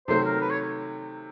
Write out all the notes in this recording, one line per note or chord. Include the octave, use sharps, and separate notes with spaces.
C3 D#3 F#3 A3 C5
A#4
B4
C#5